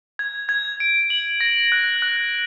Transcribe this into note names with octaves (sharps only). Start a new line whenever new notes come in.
G#6
G#6
D7
F#7
A#6
F#6
F#6